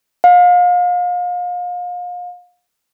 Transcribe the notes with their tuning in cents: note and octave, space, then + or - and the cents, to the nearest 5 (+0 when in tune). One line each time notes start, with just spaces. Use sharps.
F5 +35